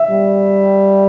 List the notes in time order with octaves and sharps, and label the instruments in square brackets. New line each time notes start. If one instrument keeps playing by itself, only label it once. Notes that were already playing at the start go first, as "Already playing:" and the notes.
Already playing: [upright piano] E5
[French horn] G3